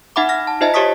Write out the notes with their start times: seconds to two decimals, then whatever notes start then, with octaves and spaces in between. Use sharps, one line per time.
0.16 D#4 E5 F#5 B5 D6
0.29 F6 A#6
0.47 A5
0.61 D#4 F4 C5 D#5 E5 A5
0.74 G4 C#5 A5 C#6 D#6 B6